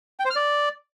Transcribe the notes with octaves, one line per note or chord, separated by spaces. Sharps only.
G5
C5
F6
D5